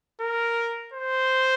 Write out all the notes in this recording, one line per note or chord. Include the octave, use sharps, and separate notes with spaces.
A#4
C5